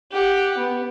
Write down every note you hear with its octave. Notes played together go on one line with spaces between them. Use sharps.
G4 F#5
B3